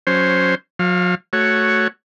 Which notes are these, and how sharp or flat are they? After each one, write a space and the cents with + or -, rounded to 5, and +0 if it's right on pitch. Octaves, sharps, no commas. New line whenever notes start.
F#3 -15 C#4 +0 C5 +0
F#3 -45 F5 +0
A3 +0 F#4 +0 C#5 +0